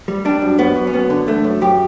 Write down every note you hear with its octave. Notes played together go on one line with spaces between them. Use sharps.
G3
G3 D4
F#2
F#2 B3
F#2
C#4
F#2 B3
D3
E3 A3
F#2
F#2 G4